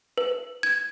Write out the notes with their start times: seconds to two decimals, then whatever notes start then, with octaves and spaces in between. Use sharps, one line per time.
0.18 B4
0.63 G#6